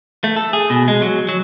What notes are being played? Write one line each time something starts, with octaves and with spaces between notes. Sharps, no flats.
A3
A4
G#4
B2
G#3
F#3
F#3